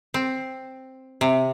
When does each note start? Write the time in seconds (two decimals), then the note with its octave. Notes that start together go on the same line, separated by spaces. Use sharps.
0.14 C4
1.21 C3